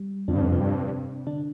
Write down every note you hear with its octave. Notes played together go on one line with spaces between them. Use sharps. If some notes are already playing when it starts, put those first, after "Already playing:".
Already playing: G3
F2 D3 D4
G2 C3 C4
F2 B3
C3 C4
G2
D3 D4